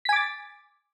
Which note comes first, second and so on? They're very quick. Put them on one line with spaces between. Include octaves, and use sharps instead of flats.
B6 G#5 D6 A6